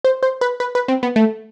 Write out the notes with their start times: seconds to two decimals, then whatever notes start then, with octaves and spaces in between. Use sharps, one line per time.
0.04 C5
0.23 C5
0.41 B4
0.60 B4
0.75 B4
0.88 C4
1.03 B3
1.16 A3